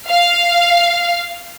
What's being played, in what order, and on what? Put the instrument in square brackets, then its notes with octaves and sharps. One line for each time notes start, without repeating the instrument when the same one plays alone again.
[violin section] F5